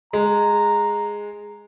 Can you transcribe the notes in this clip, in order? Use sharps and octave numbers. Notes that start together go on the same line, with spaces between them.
G#3 A#5